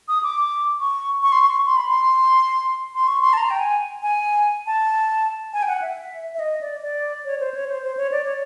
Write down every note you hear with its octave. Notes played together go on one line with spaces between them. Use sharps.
D#6
D6
C#6
C#6
C6
C#6
C6
B5
C6
C6
C#6
C6
A5
A#5
G5
G#5
G#5
A5
G#5
G5
F#5
E5
E5
D#5
D5
D5
C#5
C5
C#5
C5
C5
C#5
D5
C#5